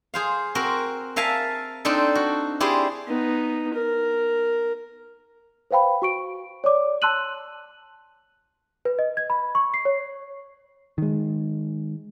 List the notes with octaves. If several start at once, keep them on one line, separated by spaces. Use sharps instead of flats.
G#4 C5 F5
C4 F#4 A#4
A#4 E5 F5 G#5 A5
C4 D4 D#4 A4
F#4
E4 G4 G#4 C5 D5
B3 D#4
A#4
B4 C5 F5 G5 B5
F#4 C#6 D7
C#5 D5 D6
A5 C6 E6 F#6 D#7 F#7
B4
D#5
G#6
B5
C#6
C7
C#5
D#3 G#3